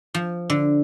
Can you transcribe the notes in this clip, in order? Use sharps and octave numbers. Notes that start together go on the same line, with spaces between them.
F3
D3